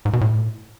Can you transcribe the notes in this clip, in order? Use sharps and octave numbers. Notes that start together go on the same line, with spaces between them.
G#2
B2
A2